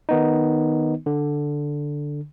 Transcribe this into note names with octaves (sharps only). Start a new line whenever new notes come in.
D#3 B3 D#4
D3